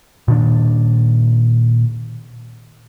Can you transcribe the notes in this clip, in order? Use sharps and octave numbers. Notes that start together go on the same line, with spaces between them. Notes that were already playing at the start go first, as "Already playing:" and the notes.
A#2 D#3 D4